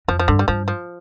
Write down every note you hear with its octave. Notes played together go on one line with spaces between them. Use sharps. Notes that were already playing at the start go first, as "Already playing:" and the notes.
F2 F3
F3
G2 D3
G3
G2 F3
F3